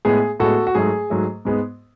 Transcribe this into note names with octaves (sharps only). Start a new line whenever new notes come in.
A2 G#3 B3 G#4
A2 G#3 B3 F#4 A4
F#4
G#2 F#3 A3 G#4
G#2 F#3 A3
G#2 G#3 B3